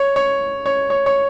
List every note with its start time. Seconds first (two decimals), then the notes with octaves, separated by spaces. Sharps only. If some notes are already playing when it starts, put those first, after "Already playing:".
Already playing: C#5
0.16 C#5
0.66 C#5
0.90 C#5
1.06 C#5